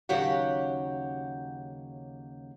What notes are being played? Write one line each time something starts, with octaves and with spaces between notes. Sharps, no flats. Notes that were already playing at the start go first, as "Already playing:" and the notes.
D#2 C#3 F#3 G4 C#5 F#5